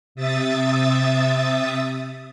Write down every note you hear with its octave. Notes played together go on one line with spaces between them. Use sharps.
C3 E5 D#6 A6